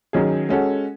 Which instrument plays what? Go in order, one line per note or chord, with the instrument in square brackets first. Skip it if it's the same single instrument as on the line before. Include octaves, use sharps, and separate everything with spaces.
[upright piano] D#3 F#3 C#4 G#4
G#3 C#4 F#4 A4